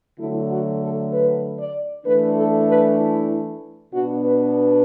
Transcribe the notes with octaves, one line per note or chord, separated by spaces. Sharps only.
D3 F#3 A3 E4
F#4
A4
B4
D5
E3 A3 D4 B4
A4
B4
E4
B2 B3 D4 F#4
B4